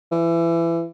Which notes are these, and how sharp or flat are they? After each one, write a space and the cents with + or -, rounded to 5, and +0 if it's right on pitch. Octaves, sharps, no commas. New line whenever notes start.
E3 +25